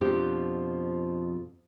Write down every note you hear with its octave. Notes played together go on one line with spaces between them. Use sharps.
F2 B2 F3 D4 G4